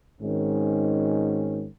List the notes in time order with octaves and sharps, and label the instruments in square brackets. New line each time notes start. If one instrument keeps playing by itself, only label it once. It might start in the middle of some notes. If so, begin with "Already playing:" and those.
[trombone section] G#1 G#2 D#3 C#4